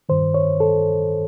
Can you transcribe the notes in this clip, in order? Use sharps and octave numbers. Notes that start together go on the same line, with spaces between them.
G2 D#3 C5
C#5
A4